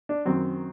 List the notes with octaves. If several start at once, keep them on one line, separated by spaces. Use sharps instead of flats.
D4
F#2 D#3 F#3 C4